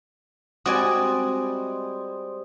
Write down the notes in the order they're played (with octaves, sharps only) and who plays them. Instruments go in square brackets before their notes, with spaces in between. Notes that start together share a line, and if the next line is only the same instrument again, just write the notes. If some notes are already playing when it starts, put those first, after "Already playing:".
[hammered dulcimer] G3 G#3 C4 [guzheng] F#4 D5 G#5 [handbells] D#6